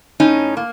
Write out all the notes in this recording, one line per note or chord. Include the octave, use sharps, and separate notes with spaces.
A2 C#4 D#4
A#3